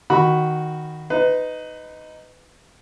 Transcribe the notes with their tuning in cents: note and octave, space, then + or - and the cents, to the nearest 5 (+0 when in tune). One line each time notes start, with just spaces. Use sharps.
D#3 +0 F#4 +0 B5 +0
D#4 +0 B4 +25